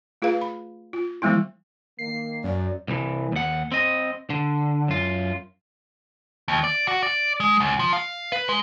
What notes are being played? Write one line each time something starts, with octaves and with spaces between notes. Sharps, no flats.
A3 F4 G#4 B4 F5
B5
F4
E3 G3 G#3 B3 E4
D#3 A#3 C7
F#2 D5
C2 E3
D#2 F#5
C4 D#5
D3
F#2 F4
D#2
D5
F#4
D5
G#3
C#2
F3
F5
B4
G#3